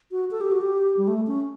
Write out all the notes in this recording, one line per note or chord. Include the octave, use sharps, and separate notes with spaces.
F#4
A4
G4
F#4
G4
G3
A3
C#4